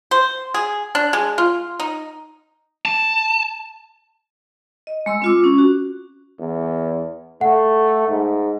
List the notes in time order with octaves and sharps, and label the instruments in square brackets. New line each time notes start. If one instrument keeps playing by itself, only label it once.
[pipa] C5
G#4
D4
G#3
F4
D#4
[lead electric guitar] A5
[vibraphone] D#5
G#3 C6 E6
C4 F4 D6
C#4
F#4
[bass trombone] E2
[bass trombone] A3 [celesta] F#5
[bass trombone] G#2